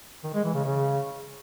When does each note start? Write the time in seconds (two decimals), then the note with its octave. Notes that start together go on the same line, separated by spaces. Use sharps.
0.24 D#3
0.34 G#3
0.44 E3
0.55 C#3
0.65 C#3